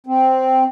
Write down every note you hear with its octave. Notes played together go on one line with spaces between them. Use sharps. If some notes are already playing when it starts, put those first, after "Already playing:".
C4